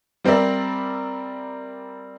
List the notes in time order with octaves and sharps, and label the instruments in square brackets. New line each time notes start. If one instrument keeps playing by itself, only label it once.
[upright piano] G3 C4 A#4 D5 E5